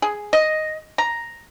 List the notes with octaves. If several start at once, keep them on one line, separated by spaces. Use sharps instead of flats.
G#4
D#5
A#5